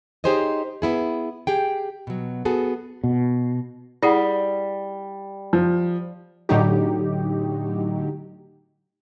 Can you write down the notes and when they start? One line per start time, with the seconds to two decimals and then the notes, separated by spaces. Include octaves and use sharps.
0.24 D#4 G4 G#4 C5 C#5 D#5
0.82 B3 E4 G#4
1.47 G4 G#4 G5
2.07 B2 F#3
2.45 B3 F#4 G#4 A4
3.04 B2
4.02 G3 E4 G#4 F#5
5.53 F3
6.49 A2 D3 F#3 D#4 G4